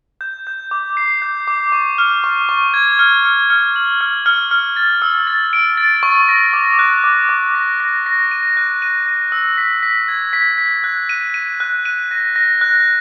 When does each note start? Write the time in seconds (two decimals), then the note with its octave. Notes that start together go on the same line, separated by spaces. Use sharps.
0.21 G6
0.47 G6
0.71 D6
0.97 C7
1.22 G6
1.47 D6
1.72 C#6
1.98 F6
2.24 C#6
2.49 C#6
2.74 G#6
2.99 F6
3.25 F6
3.50 F6
3.76 F#7
4.01 F6
4.26 F6
4.51 F6
4.76 A6
5.02 E6
5.27 A6
5.53 D7
5.77 A6
6.03 C#6
6.29 A#6
6.53 D6
6.79 F#6
7.04 D6
7.29 D6
7.55 A#6
7.80 A#6
8.06 A#6
8.31 D#7
8.57 F#6
8.82 D#7
9.06 A#6
9.32 E6
9.58 B6
9.83 B6
10.08 G#6
10.33 B6
10.58 B6
10.84 F#6
11.09 D#7
11.34 D#7
11.60 F#6
11.85 D#7
12.11 A#6
12.36 A#6
12.61 F#6